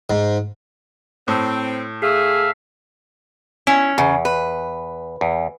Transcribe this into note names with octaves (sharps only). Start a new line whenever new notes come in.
G#2
A2 C4
A3 G#4 E5 F5
C#4 E4
E2 C#3
B4
E2